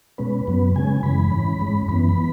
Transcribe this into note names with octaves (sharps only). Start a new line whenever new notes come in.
B2 G#3 C#4 B4
F#2 F#3 B3
C#3 G#3 C#4 G#5
F#2 C#3 E3 G#3 B5
G#2 E3 C#4
G#2 G#3 C#4
F#2 E3 B3 B5
B5
E3 B3